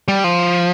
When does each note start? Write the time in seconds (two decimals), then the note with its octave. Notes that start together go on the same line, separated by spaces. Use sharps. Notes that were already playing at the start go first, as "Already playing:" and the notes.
0.08 G3
0.24 F3